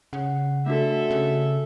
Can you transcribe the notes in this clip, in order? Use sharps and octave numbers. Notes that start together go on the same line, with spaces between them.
C#3 F#5
A3 D4 F#4 A4 E5
C#3